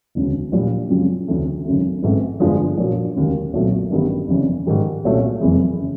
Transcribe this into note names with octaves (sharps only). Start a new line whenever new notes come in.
E1 D2 C#3
A#1 A#2 G3
F#2 C#3 F3 G#3 C4
D2 C#3 E3 A3 C4
G#1 F#2 C#3 F#3 A3
A1 G#2 E3 A3 C4
G1 G2 D3 F3 G#3
A#1 A#2 F#3 A#3
E1 D#2 C#3
B1 A#2 F#3 A3 C4
A1 G2 D#3 G3 B3
G1 F2 C#3 E3
G#2 D#3 G3
C2 A#2 F#3 A3 C#4
F#1 F2 C3 E3 G#3
C#3